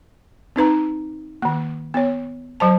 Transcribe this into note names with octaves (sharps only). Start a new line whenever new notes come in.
C4 D#4 B4 A#5
D#3 A#3
B3 C#5
F#3 C5 A5